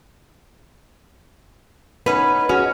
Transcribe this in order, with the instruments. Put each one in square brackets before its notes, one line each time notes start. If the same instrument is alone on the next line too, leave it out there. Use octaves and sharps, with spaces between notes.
[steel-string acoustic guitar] B3 D#4 [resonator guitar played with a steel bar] C#4 B4
[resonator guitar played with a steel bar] C#4 [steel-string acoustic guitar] F#4 G#4 D#5